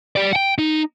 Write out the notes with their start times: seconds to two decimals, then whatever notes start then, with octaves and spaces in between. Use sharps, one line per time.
0.16 G4 D5
0.33 F#5 G5
0.58 D#4